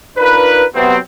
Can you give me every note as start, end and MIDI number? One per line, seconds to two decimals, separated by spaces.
0.17 0.64 62
0.17 0.64 63
0.17 0.64 65
0.17 0.64 70
0.17 0.64 71
0.75 0.96 48
0.75 0.96 54
0.75 0.96 59
0.75 0.96 60